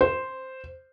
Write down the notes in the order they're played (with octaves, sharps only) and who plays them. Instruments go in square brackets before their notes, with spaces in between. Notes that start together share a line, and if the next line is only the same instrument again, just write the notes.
[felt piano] C5